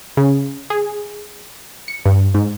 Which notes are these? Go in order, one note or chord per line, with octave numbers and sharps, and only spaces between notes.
C#3
G#4
C#7
G2
G#2